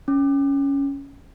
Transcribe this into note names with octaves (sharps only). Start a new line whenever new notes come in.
C#4